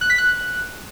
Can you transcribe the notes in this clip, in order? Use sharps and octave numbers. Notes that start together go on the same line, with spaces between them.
F#6
B6
F#6